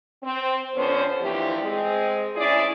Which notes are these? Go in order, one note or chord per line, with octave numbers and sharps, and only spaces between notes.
C4
F2 D3 B3 C#4 C5
D2 G2 E3 F3 G3 G4
G#3 C4 G#4
D2 C#4 E4 G#4 D5